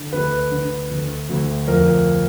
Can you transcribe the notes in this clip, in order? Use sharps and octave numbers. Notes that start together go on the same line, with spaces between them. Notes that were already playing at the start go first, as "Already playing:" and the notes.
Already playing: D3
D2 B4
D3
D2
D2
F2 A#4